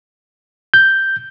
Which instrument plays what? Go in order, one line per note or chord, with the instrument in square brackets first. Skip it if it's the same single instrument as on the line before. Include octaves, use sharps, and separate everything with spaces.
[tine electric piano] G6